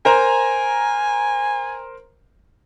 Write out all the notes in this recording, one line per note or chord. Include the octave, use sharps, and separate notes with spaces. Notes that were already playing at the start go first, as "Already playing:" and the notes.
A#4 C5 G#5 A#5